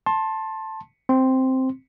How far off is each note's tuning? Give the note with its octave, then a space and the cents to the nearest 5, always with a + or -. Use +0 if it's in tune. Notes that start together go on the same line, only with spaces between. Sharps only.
A5 +0 C6 +25
C4 +0 C6 +0